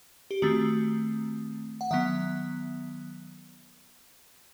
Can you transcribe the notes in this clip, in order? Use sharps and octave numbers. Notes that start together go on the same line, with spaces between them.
G4
D#3 A3 C4 F#4
F#5
D#3 F#3 B3 E5